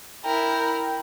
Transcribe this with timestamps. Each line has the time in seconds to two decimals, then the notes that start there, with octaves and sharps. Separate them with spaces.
0.25 E4 A#4 G5